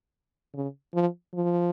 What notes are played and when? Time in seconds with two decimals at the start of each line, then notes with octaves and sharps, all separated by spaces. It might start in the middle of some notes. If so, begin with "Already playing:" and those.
0.54 C#3
0.94 F3
1.34 F3